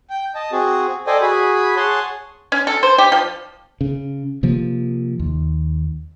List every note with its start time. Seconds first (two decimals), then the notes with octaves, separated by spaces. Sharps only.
0.10 G5
0.35 D#5 A5
0.52 C4 F#4 G#4
1.07 A4 C5 D5 D#5 G5 G#5
1.21 F#4 G#4 G#5 B5
1.76 G#4 C#5 F#5 G#5 A5 C6
2.52 C#4
2.67 A4
2.83 C5
2.98 G4
3.12 F3
3.81 C#3
4.43 C3 F3 A#3
5.20 D#2